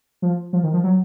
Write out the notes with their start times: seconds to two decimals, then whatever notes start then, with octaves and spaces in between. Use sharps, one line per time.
0.22 F3
0.53 F3
0.63 D#3
0.74 F3
0.84 F#3